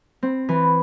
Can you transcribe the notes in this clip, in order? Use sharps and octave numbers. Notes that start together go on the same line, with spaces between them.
C4
E3